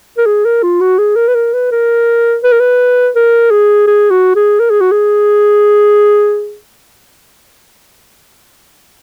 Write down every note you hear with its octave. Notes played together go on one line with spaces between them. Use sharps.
A#4
G#4
A#4
F4
F#4
G#4
A#4
B4
A#4
B4
A#4
B4
A#4
B4
A#4
G#4
G#4
F#4
G#4
A#4
G#4
F#4
G#4